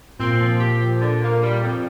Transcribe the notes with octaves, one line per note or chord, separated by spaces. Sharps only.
A#2 C4
F3
G4
F3
D3
A#3
G3
F2